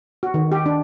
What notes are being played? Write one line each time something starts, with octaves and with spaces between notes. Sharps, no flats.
F#4
D#3
G4
D4